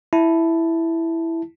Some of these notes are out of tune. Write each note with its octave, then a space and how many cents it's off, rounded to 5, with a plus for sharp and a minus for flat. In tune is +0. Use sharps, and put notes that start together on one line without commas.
E4 +0 A5 +0